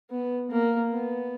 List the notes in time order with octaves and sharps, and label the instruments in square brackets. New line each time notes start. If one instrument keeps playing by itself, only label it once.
[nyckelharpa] B3
A#3
B3